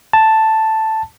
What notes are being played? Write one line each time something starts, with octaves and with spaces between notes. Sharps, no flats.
A5